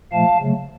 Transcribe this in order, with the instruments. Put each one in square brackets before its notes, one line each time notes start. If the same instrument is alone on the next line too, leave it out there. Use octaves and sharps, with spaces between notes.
[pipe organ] A#2 F3 A3 F5 A5
C#3 F#3 A3